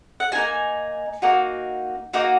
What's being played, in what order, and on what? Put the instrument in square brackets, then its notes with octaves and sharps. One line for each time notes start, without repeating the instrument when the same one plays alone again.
[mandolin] F#5
F#4 G#5
A#3 D#4
A#3 D#4 F#4
A#3 D#4 F#4